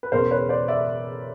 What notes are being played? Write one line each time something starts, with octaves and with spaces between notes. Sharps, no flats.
B4
E1 E2 C#3 A#4 C5
B4 C#5
C5 D5
D5 E5